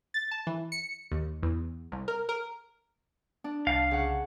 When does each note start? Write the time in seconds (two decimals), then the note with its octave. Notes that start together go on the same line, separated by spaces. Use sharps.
0.14 A6
0.31 A5
0.47 E3
0.72 C#7
1.12 D#2
1.43 E2
1.92 C2
2.08 A#4
2.29 A#4
3.44 D4
3.67 C2 F5 A5
3.91 C#3 F#5